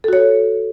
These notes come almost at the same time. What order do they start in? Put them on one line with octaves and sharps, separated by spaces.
A4 F#4 C#5